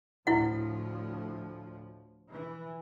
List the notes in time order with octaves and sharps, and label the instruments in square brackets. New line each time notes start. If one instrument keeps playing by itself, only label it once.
[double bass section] D2 A2 F3 [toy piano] E4 F#5
[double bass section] E3